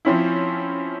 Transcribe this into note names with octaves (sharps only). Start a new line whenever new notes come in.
F3 C4 C#4 E4